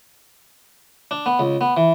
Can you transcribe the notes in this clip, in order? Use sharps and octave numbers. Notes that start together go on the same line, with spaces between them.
D4
B3
C#2
B3
E3